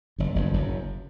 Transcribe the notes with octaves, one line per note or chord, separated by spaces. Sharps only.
F#1 F#2
G1 G2
F#1 F#2